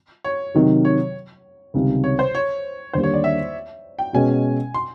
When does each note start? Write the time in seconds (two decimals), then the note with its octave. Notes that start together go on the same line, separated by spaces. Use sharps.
0.25 C#5
0.55 C3 D#3 F#3
0.85 C#5
1.74 C#2 C3 D#3 G3
2.04 C#5
2.19 C5
2.35 C#5
2.93 D#2 D3 G3 A#3 C5
3.03 C#5
3.14 D5
3.24 E5
3.99 G5
4.13 B2 G#3 C#4 F#4 G#5
4.74 C6